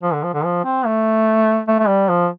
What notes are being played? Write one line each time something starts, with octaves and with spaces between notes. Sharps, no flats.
F3
D3
F3
D3
F3
C4
A3
A3
A3
G3
F3